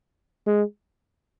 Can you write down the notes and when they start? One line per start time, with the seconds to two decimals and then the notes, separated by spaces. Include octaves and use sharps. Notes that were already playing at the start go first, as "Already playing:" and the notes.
0.47 G#3